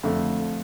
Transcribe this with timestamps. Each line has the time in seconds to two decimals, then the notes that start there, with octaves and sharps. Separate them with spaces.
0.03 F2 D3 A3